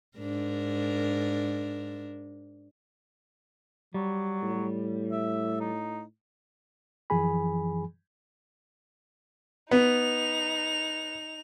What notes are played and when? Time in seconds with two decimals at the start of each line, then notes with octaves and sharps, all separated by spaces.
0.18 G#2 D4 A#4
3.94 F#3 G3
4.43 A2
5.12 E5
5.60 D#4
7.10 F#2 E3 F3 G#4 G#5 B5
9.71 B3 D#4 F7